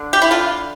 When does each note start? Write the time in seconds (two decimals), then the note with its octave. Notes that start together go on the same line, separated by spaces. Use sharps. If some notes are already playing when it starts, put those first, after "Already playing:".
Already playing: D3
0.13 G4
0.22 E4
0.31 D3 F4